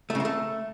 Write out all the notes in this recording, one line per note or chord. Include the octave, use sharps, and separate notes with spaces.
A3
C#3
A#3
A3